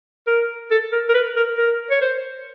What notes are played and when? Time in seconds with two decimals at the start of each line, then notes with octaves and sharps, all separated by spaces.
0.27 A#4
0.71 A4
0.92 A#4
1.09 A#4
1.14 B4
1.36 A#4
1.58 A#4
1.91 C#5
2.01 C5